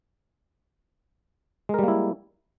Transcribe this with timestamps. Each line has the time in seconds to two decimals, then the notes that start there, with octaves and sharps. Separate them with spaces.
1.69 G#3
1.74 A#4
1.79 G3
1.83 A#3
1.88 E4